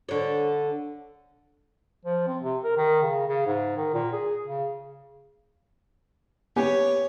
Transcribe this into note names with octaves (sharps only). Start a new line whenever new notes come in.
D3 C#5
F3
C4
C3
A#4
D#3
C#3
C#3
G#2
D#3
A#2
G#4
C#3
B3 G4 C#5 G#5